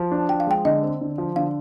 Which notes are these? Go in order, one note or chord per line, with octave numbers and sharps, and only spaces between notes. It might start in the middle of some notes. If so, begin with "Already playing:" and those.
Already playing: F3
D4
F3 G5
F5
G#3 G5
D3 D#5
C4
D3
F3
D3 F5